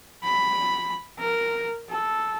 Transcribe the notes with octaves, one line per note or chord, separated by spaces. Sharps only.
B5
A#4
A4